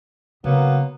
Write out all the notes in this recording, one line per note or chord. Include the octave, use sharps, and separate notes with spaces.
C#3 F#3 A#3 B3